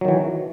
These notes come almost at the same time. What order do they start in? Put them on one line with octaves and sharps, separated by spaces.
F#3 D#3 E3